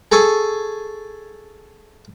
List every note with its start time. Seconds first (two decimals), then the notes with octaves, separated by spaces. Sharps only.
0.12 G#4 A4 G#5 C#6